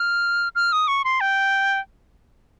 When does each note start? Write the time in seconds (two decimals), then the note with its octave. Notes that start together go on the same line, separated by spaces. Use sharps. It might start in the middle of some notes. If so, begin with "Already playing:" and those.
Already playing: F6
0.55 F6
0.72 D#6
0.88 C#6
1.05 C6
1.21 G5